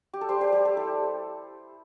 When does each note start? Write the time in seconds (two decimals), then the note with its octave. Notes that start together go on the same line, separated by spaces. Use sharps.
0.13 G4
0.21 A4
0.28 G3 G4 C5
0.41 G4 C5
0.52 G3 G4
0.65 A4
0.76 E4 A4